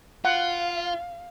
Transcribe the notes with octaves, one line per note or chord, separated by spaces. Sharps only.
F4 F5 F#5